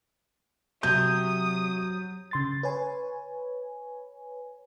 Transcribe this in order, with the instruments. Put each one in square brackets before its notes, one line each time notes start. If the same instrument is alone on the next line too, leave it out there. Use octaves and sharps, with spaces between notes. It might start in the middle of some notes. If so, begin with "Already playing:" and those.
[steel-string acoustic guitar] C3 [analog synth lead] F#3 [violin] D#6 [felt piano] G6
[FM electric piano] C#3 C6 A6
B4 C#5 G#5